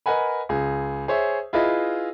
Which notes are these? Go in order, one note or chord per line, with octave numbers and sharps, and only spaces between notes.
A#4 B4 D#5 F#5 G#5 B5
C#2 G#4
G#4 C5 C#5 E5
E4 F4 G#4 B4 D#5 E5